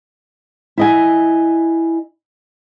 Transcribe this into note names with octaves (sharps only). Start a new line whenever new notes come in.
E4 D#5 G#5